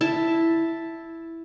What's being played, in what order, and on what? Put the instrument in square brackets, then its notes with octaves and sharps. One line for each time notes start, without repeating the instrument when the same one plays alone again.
[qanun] E4 A5